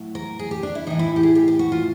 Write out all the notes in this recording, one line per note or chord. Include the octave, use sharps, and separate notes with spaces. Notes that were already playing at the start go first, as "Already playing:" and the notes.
Already playing: A2 F#3
A#4
G#4
G4
D4
E4
A2 E3 D#4
E4
G4
G#4
G4
G4
F#4
F4